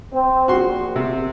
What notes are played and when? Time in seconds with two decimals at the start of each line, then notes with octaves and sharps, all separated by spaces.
0.11 C4
0.48 A#1 F#4 C6
0.96 C3